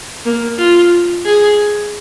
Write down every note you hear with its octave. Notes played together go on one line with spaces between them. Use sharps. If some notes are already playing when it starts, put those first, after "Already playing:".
A#3
F4
G#4